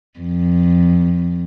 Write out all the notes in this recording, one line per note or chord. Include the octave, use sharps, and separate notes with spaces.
F2